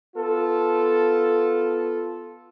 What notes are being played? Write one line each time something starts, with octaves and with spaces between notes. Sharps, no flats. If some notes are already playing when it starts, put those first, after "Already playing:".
B3 F4 A4